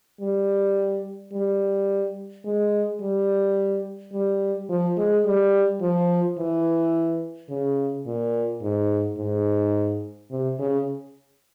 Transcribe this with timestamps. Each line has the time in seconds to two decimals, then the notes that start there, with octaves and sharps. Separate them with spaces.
0.21 G3
1.33 G3
2.45 G#3
3.01 G3
4.13 G3
4.69 F3
4.98 G#3
5.26 G3
5.82 F3
6.38 E3
7.50 C#3
8.06 A#2
8.62 G#2
9.18 G#2
10.31 C3
10.59 C#3